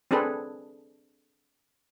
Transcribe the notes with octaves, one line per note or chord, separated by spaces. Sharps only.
C4 D4 G#4 A4 B4